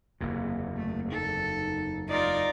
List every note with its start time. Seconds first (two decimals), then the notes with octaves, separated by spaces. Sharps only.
0.21 F#1 E2 C3 A#3
0.77 A3 A#3
1.12 D#4 A4
2.09 D#4 F4 A#4 D5